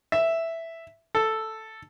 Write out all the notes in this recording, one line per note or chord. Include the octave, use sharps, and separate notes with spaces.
E5
A4